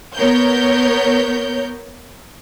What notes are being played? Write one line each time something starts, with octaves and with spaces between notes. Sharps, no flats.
B3 A#4 C#5 G6